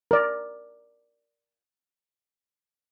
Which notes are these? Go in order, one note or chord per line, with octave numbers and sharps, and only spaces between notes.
A#4 D5